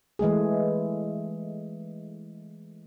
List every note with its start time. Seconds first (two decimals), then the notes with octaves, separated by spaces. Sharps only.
0.19 E3 G#3 A3 G#4